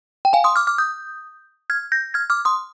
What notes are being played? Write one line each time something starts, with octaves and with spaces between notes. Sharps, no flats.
G5
F5 G#5
C6 D#6
D6 F6
D6 F6
D#6 G6
F6 G#6
G6 A#6
F6 G#6
D6 F6
C6 D#6